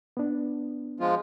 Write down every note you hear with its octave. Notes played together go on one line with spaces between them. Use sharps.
B3 D4
F3 G#3 F4